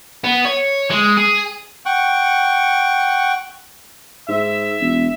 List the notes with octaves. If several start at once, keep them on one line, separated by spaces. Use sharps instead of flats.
B3
C#5
G#3
G#4
F#5 G5 C#6
G#2 E5
E1